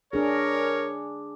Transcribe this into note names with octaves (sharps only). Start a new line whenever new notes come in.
D4 G#4 A#4 C#5